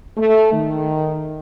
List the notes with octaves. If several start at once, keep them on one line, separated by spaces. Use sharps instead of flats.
A3
D#3